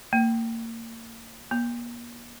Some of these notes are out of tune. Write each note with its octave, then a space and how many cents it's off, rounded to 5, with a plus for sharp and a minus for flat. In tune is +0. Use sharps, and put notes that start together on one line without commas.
A#3 -30
A#3 +40